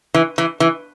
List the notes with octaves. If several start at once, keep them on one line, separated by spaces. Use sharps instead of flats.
E3
E3
E3